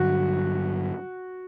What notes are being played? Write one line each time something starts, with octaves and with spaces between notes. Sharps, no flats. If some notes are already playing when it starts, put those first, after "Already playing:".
Already playing: G2 D3 F#3 F#4